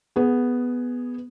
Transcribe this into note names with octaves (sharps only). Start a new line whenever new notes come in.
B3 G#4